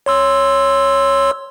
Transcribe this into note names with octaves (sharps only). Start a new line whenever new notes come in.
C#5 C6 E6